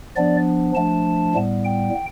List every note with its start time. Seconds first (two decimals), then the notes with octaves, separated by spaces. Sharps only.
0.16 F3 B3 D4 D5
0.75 F3 A3 D4 A5
1.35 A2 G3 B3
1.65 G5